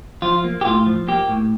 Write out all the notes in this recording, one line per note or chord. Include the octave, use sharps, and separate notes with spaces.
F3 F4
A#3
G4
A2 F4
F3
A#3 G4
A2